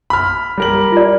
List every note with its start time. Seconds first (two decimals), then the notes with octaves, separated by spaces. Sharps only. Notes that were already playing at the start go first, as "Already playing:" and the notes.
0.10 B5 F6
0.58 G3 A#4 F#7
0.92 F4 D5